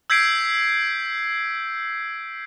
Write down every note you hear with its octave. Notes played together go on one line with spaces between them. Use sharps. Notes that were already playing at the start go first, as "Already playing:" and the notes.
E6 G6 G#6 B6 C7 D7